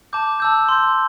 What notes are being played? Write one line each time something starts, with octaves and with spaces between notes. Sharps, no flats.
A5 D6 G6
A5 E6 G6
C6 G6